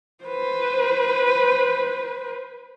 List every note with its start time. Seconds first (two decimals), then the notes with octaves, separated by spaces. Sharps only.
0.24 B4 C5